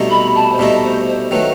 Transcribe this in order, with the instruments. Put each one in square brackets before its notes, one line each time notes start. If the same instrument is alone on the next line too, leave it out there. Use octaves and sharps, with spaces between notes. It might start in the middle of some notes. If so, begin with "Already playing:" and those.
Already playing: [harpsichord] C2 B2 A3 D#4
[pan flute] B5
A5
C5
[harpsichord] C2 B2 A3 D#4 [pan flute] D#5
[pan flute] C5
C5
[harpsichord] D#3 F#3 A3 [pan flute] B4